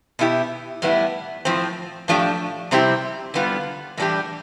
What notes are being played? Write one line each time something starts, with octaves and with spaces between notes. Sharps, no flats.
B2 B3 E4 G4
A2 G3 B3 E4
A2 F3 C4
A2 F3 A3 D4 G4
C3 G3 C4 E4 G4
D3 G3 B3 F4
A2 E3 G3 D4 G4